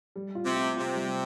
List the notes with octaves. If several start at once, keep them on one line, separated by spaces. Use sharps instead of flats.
G3
F4
C3
F4
C3 F4
G3